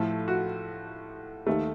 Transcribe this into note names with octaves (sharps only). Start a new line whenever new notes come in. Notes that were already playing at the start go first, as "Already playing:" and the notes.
Already playing: A2 F3 A3 F4
F#4
D#2 D#3 A3